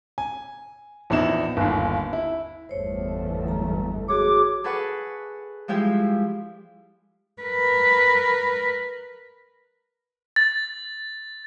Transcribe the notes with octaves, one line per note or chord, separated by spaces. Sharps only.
G#5
A#1 E2 D#4 E4 E7
G1 D#2
E4
G1 E2 A3 C5 C#5
F#3 A#5
F#4 G#4 C#5 D6
G#4 A4 B4 F#5 C#6
F3 G3 G#3 E4 G4
A#4 B4
A6